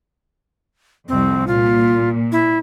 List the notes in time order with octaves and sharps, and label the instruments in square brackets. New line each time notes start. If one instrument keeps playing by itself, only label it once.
[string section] C2 F2 [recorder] C4
[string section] A#2 [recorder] F4
[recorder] E4